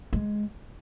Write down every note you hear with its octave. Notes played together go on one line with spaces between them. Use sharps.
G#3